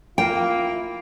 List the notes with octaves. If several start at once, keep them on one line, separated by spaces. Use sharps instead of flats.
A#3 E4 F4 G5